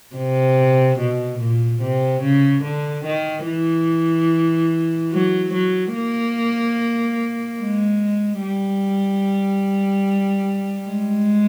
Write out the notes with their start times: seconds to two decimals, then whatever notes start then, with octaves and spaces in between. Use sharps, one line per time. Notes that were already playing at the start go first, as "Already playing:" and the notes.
0.16 C3
0.99 B2
1.40 A#2
1.82 C3
2.23 C#3
2.64 D3
3.05 D#3
3.46 E3
5.12 F#3
5.53 F#3
5.94 A#3
7.59 G#3
8.41 G3
10.89 G#3